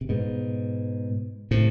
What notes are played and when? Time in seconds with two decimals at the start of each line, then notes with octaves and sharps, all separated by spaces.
0.01 C3
0.09 G#2 B2
1.51 A2 C3